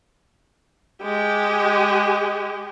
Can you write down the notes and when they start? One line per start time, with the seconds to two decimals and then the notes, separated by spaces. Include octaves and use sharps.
1.02 G#3 G4